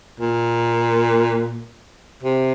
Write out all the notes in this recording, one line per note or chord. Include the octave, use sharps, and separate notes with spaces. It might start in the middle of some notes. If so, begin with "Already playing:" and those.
A#2
C3